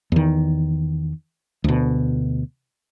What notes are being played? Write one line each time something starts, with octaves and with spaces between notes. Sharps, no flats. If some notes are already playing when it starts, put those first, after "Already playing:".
E2 D#3
D2 B2